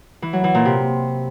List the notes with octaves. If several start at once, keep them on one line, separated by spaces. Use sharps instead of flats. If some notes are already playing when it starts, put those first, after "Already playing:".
E3
F#3
E3
A#2
C3